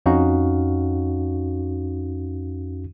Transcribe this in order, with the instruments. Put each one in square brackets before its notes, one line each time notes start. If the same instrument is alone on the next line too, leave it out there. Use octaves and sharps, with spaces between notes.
[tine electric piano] F2 C#4 D#4 F#4 F5